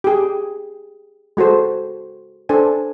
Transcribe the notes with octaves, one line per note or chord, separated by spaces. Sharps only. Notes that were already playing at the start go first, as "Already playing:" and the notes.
G4 G#4
G#3 F#4 A4 C5
D4 A4 C5 G#5